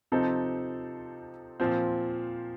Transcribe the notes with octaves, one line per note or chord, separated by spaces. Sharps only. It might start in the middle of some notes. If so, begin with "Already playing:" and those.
C3 F3 C4 D#4 A4
A#2 F3 C4